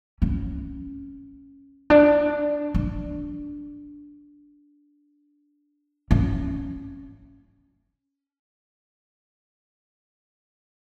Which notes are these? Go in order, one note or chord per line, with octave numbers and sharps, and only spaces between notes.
C#4
D4
D4
C#4